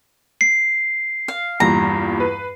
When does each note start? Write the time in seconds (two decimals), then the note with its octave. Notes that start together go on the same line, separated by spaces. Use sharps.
0.41 C7
1.28 F5
1.60 E2 G2 A#2 A#5
2.20 B4